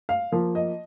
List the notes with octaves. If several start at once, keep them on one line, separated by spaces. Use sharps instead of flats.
F5
F3 A#3
D#5